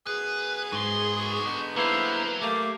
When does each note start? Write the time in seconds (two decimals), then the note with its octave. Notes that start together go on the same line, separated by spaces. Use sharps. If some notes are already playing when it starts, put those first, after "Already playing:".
0.07 F#2 B3 G#4 B4
0.72 G#2 F#4 C6
1.45 D3 G#3 B3 D#4
1.76 F#3 A#3 E4 B4 C5
2.41 A3 A#3 G4